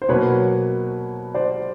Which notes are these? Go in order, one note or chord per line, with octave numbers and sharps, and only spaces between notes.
C5
B2 F#3 A#3 B4 C#5
C5 D5